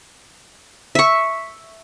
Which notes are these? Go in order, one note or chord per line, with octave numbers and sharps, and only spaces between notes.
E5 C#6